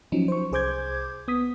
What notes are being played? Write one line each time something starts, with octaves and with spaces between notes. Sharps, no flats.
F3 F#3 C#4 D#4
C5 C#6
C2 G#4 C5 D6 G6 G#6
B3 D#6 B6